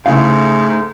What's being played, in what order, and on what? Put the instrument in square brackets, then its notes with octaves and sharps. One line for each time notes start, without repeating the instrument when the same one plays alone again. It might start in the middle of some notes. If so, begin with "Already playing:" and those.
[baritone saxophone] G#2 [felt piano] C#3 [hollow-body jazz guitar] A3 E4 F5